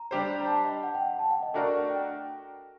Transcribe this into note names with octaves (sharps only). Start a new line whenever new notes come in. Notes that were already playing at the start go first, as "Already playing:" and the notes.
Already playing: A#5
G3 D4 G4 C5
A#5
A5
D#5
F#5
G5
F#5
A5
F#5
D#5
A3 D4 F#4 A#4 D5
G5